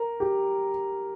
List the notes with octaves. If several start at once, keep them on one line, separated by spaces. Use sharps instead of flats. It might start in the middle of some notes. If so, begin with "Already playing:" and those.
Already playing: A#4
G4